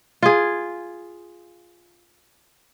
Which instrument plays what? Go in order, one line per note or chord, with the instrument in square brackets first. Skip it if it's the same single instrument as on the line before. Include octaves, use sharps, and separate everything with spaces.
[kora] F4 G#4